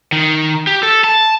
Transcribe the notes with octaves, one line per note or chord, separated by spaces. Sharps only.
D#3
G4
A4
A5